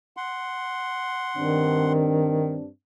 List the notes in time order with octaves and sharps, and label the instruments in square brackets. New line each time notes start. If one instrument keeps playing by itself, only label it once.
[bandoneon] F#5 C6
[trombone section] G2 C4 D4 [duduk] D#3